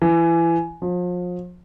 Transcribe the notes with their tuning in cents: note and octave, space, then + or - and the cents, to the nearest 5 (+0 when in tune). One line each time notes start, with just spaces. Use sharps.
E3 +25
F3 +35